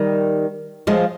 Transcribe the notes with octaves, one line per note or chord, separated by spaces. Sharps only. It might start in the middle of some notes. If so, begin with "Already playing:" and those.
Already playing: D#3 G3
F3 G#3